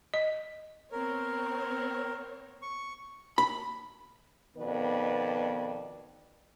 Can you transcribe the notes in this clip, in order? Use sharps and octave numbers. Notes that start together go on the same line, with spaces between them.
D#5
B3 C4 A#4 C#5
C#6
B5
F2 B2 D#3 B3 B4 D5